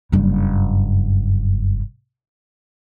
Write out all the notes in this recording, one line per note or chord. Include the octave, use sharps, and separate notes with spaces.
F#1 G2